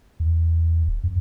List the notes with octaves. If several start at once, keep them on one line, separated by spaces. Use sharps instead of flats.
E2
D1
F2